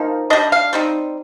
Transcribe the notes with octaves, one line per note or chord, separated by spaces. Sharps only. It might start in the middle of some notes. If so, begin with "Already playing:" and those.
Already playing: F3 A#3 D#4
G3 D4 D#5
F5
G3 C4 D#4